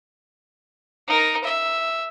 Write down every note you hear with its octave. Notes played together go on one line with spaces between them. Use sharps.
D#4 A#4
E5